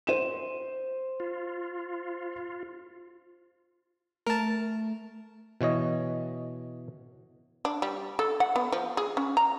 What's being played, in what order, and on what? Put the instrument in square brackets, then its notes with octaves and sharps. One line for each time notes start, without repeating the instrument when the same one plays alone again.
[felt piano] C5 D#7 E7
[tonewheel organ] F4
[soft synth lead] A3 [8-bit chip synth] A#4 A5
[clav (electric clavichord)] B2 E3 C#5 D#5
[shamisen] D4
G3
A4
F#5
B3
F3
G#4
C#4
A#5